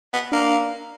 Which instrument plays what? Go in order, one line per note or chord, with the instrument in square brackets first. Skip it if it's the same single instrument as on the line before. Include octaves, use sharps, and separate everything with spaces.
[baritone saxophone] B3
[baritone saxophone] A#3 [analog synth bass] D4